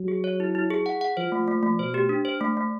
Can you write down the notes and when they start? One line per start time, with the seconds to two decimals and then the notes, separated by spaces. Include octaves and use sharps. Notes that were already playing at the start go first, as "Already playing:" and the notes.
Already playing: F#3
0.08 G#4
0.24 C#5
0.40 E4
0.55 E4
0.70 G#4
0.86 F#5
1.01 F#5
1.17 F3 C5
1.32 A3
1.48 A3
1.63 A3
1.79 B2 C5
1.94 G4
2.09 D4
2.25 C5
2.41 A3
2.57 A3